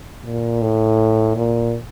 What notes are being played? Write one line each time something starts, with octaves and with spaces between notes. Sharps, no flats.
A#2
A2
A#2